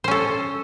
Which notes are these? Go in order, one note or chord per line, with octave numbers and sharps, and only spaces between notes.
C#4 A4 C5